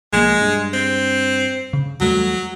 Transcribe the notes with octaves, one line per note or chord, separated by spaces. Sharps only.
B1 F3 G#3 A#3
G2
C4
C#3
E2 F#3 G3 A3